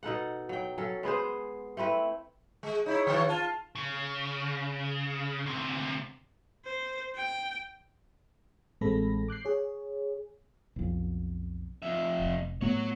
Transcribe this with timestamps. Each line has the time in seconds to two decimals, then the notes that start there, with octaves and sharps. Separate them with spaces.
0.03 B2 D#4 A4 F#5
0.49 F#3 G5
0.78 F#3 C#4 A4
1.03 G#3 B3 G#4 C5
1.77 A3 C4 E4 B4
2.63 G#3
2.86 D#4 E4 C#5
3.07 D#3 E3 F#3
3.29 F4 A5
3.75 C#3
5.46 D2 C3
6.65 C5
7.16 G5
8.81 A1 G#3 C4 A4 B5 A#6
9.28 D6 F#6 G6 C7
9.45 G#4 C#5
10.76 B1 F2
11.82 F2 E5
12.19 F1 C2
12.61 A2 A3 B3 F#4 C#5